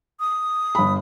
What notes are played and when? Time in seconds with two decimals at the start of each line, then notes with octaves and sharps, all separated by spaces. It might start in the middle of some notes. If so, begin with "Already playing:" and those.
0.20 D#6
0.75 G1 B5